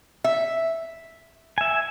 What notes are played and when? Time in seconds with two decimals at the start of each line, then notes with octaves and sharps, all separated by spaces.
0.24 E5
1.58 E5 G#5